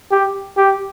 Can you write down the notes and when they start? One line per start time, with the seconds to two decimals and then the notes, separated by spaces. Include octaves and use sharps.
0.11 G4
0.57 G4